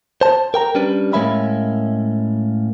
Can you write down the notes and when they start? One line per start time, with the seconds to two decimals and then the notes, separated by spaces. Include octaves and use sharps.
0.21 C5 A5
0.54 A#4 G5 A#5
0.75 G3 C#4 D4 B4
1.13 A2 G#3 A#3 C#4 E5 B5